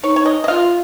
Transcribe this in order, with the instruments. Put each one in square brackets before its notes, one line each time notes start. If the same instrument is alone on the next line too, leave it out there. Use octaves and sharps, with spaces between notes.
[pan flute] D#4 [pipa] C#5
[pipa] C#5
D#5
D#5
[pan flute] F4 [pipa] F5